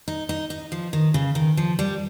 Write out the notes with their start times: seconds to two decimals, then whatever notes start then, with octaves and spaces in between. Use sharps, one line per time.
0.08 D#4
0.29 D#4
0.50 D#4
0.72 F3
0.93 D#3
1.14 C#3
1.35 D#3
1.57 F3
1.79 G3